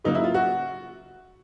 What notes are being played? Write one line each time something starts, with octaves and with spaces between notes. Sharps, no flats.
C#3 F#3 A#3 D#4
E4
F4
F#4